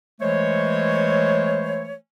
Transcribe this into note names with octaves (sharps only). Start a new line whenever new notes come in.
E3 G#3 A3 C5 C#5